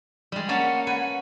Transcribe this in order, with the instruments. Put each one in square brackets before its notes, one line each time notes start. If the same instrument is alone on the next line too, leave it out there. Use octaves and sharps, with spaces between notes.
[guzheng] G3 G#3
[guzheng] A#3 C#4 A5 [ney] F#5
[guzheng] B4 G#5